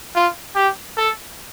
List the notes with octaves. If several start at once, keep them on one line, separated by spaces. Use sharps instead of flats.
F4
G4
A4